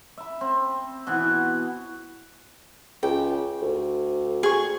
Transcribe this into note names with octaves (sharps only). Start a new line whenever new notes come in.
E5 B5
C4
B2 E3 B3
C#2 G5
D2
G#4 C#6